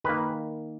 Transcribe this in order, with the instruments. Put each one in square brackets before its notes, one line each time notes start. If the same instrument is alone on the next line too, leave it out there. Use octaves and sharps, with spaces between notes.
[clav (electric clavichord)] D#3 A#3 B4